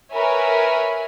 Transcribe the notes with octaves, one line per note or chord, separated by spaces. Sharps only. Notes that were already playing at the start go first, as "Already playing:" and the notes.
A#4 B4 C#5 E5 G#5 B5